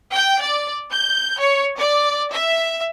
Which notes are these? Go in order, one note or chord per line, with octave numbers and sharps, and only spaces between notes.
G5
D5
G6
C#5
D5
E5